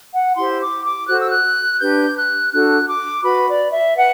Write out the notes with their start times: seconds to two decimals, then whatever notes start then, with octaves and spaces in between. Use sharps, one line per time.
0.13 F#5
0.37 E4 G4 C5 C6
0.61 D6
0.85 D6
1.09 F#4 A4 C5 F#6
1.20 E6
1.30 F#6
1.80 D4 G4 B4 G6
2.17 F#6
2.52 D4 F#4 A4 F#6
2.89 D6
3.24 F#4 B4 B5
3.48 D5
3.72 E5
3.96 B4 F#5